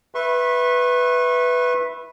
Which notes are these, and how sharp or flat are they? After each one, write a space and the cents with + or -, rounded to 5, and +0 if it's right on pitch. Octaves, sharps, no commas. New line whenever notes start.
B4 +0 E5 +0 C#6 -40